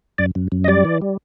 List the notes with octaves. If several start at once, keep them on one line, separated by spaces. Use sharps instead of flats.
F#2 D5
F#2
F#2
D#5
G3 D5
E3
G3